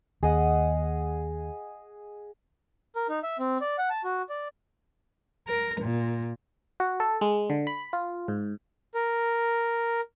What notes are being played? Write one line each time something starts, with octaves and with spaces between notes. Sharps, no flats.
D#2 G#4 D#5 F#5
A#4
D#4
E5
C4
D5
F#5
A5
F#4
D5
A#4
A#2
F#4
A4
G#3
D3
B5
F4
G#2
A#4